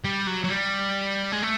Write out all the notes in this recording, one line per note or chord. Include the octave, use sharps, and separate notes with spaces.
G3
F#3
F#3
G3
G#3
A3